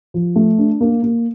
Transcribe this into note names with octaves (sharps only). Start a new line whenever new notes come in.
F3
A3
D4
A#3
A#3